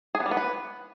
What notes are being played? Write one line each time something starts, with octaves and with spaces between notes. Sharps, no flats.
G#4
B3
G3
B3
B4